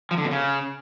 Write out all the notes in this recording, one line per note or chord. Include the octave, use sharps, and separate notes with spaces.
F3
D3
B2
C#3